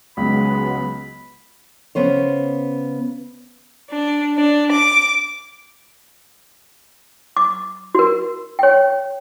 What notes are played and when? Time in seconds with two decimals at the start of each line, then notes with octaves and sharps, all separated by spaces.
0.17 C#2 F#3 G#3 B3 B5
1.95 C#3 B3 C5 C#5
3.90 D4
4.36 D4
4.71 D6
7.37 D6
7.95 F#4 A#4
8.59 C#5 G5